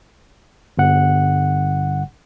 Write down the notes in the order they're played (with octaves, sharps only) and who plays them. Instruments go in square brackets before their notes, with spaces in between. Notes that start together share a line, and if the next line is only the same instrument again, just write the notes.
[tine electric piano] G1 F#5